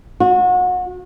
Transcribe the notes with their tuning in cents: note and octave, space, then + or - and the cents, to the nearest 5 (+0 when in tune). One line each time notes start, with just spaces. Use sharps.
F#4 -30